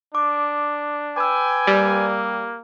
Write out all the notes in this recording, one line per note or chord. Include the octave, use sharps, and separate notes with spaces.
D4 D6
B4 G5 G#5 D6 E6
G3 A#3